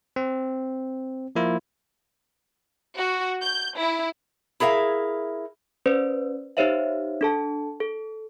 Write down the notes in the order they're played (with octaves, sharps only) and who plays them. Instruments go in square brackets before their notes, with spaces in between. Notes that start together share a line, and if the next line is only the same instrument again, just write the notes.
[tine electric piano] C4
F3 A#3 E4 F4
[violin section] F#4
G6
E4
[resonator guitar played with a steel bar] E4 G#4 A#4 E5 F5
[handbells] C#4 B4 C5 D5
D#4 G4 C5 C#5 E5 F5
D4 A4 A5
A4